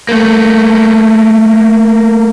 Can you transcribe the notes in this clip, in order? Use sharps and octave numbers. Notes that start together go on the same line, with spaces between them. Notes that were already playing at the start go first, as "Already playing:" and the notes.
A3 A#3